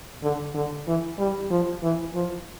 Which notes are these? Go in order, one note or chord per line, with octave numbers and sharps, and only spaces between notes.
D3
D3
E3
G3
F3
E3
F3